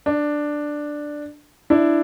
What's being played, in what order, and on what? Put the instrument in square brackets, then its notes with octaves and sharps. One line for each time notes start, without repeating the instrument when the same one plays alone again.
[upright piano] D4
D4 E4